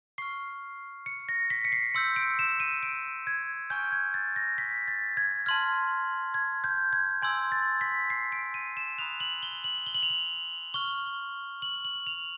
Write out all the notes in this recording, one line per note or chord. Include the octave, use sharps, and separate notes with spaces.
C#6 F6 C7
C#7
A#6
B6
C#7
C7
C6 E6 G6 C#7
D7
E7
D#7
D7
G#6
G#5 C#6 F6 G6
G#6
A6
A#6
B6
A6
G#6
A5 C6 F6 G#6
G#6
G6
G#6
G#5 C6 E6 G6 G#6
A6
B6
C7
D7
D#7
E7
B5 D#6 F#6 F7
F#7
G7
F#7
G7
F#7
F7
F#7
C#6 F6 G7
F#7
F#7
F7